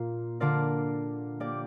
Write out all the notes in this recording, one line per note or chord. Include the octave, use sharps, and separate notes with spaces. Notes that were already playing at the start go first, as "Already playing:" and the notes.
Already playing: A#2 A#3 F4
D3 A#3 F4 A#4 D5
A#3 G4 D5